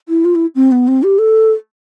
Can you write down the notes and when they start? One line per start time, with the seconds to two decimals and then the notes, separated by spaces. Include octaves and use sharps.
0.09 E4
0.25 F4
0.35 E4
0.55 C4
0.72 B3
0.88 C4
1.03 G4
1.19 A4